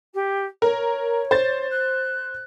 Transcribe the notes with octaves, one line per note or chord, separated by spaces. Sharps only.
G4
A#4 C#5
C5 A6
F#6